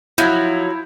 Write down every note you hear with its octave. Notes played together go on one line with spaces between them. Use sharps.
F3 F#3 E4 G6